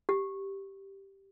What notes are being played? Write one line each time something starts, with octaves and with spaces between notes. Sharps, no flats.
G4